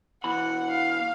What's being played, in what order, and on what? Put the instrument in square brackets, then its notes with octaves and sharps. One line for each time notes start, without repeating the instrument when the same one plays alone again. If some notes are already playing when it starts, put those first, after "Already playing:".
[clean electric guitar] B2 E3 B5 [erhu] F#5
[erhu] F5